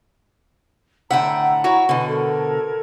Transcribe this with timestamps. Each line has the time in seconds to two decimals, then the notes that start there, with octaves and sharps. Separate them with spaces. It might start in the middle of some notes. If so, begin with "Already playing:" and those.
1.10 A2 D3 E5 F#5 G5 A#5
1.64 E4 F#4 C#5
1.89 B2 D3 G#5
2.07 A4 A#4 G#6